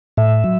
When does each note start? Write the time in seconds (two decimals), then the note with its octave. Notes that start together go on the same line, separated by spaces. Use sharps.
0.17 A2 E5
0.44 F#3